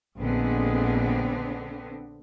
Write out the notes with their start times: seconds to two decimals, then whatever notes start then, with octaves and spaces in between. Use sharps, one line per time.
0.18 A#1 D3 G#3 B3 C4